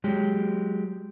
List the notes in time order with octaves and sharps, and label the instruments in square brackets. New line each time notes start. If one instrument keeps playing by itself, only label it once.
[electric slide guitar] F#3 G#3 G4